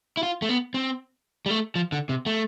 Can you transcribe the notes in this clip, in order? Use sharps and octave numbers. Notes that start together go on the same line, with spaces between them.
E4
F4
A3
B3
C4
G3
A3
F3
D3
C3
A3